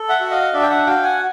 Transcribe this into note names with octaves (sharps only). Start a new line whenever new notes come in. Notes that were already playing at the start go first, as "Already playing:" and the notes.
Already playing: A4
E5 F#5
F#4
D#5 F5
D4 D5 E5
G5
E5 F#5
F#4 F5 G5
F#5 G#5